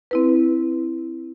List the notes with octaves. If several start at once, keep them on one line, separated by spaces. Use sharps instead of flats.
C4 E4 B4